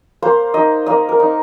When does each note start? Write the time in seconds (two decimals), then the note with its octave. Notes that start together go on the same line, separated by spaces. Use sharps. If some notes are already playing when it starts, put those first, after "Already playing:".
0.22 A#3 C5
0.54 D#4 D#5
0.86 A#3 D#5
1.09 A#4
1.20 D#4